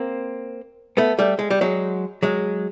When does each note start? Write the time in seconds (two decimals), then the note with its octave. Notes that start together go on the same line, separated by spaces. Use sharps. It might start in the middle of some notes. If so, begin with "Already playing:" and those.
Already playing: A#3 C4
0.97 A3 B3
1.19 G3 A3
1.39 G#3
1.51 G3
1.61 F#3 G#3
2.23 F#3 G#3